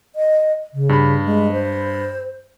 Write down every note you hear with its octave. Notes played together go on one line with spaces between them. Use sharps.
D#5
C#3
G2 B5
G#3
C5